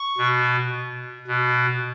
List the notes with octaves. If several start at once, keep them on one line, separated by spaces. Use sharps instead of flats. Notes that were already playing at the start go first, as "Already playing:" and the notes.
Already playing: C#6
B2
B2